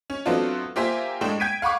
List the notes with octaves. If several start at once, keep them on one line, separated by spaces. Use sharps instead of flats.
C#4
F#3 A3 B3 C4 D4 F4
A#3 F4 G4 C5 E5 G#5
A2 G#3 D4 G5 E7
G5 G6 G#6 B6 D7 D#7
F5 F#5 B5 C#6 D6